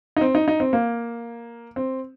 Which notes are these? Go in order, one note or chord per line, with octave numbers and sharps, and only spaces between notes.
D#4
C4
D#4
D#4
C4
A#3
C4